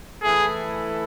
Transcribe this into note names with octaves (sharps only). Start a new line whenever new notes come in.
E3 A3 E4 G#4 A4